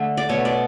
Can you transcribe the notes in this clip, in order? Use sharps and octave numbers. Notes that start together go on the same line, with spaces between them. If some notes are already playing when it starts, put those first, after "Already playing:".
Already playing: D3 A3
D5
B2 A3 C#5
D5